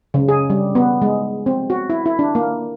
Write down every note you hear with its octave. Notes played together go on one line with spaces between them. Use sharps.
C#3
G#4
G3
B3
G#3
C4
F#4
E4
E4
D4
A#3